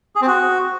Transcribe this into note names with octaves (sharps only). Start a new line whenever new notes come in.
G#4
C4
F#4